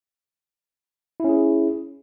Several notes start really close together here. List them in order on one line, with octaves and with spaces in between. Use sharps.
E4 C#4 G#4